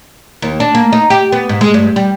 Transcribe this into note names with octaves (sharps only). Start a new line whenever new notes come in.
D#2
D4
A#3
D#4
G4
B3
G#2
G#3
G2
G3